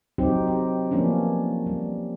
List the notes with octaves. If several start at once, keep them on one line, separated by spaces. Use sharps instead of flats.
F#3 C4 D#4 G4
G4
F3 A#3 B3 C#4 D4
G3